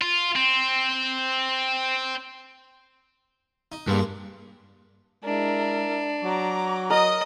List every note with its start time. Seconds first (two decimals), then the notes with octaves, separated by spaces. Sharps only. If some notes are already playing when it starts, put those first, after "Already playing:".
0.02 F4
0.35 C4
3.72 D#4
3.87 G2 G#3 A#3
5.24 G#3 D4 E4 A#4
6.23 F#3 A#5 D6
6.90 A#4 D#5 D#6